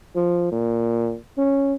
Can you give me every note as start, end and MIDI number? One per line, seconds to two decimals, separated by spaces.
0.15 0.50 53
0.52 1.16 46
1.37 1.74 61